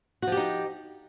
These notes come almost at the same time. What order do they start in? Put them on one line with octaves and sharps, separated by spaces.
F#4 F3 G4 D#4